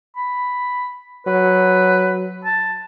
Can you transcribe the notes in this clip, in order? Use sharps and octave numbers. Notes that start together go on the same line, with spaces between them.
B5
F#3 B4
A5